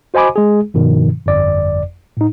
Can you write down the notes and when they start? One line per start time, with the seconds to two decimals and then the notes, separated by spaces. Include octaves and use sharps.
0.14 F#4 C5 D#5 G#5 B5 D6
0.36 G#3 G#4
0.74 G2 B2 D#3 F3
1.26 G1 F2 D5
2.17 A2 D#4